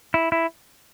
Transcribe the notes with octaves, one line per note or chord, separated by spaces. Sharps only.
E4
E4